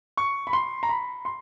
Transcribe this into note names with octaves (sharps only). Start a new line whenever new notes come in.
C#6
B5
C6
A#5
B5
C6